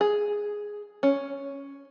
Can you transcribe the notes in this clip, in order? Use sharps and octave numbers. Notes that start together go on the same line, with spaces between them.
G#4
C#4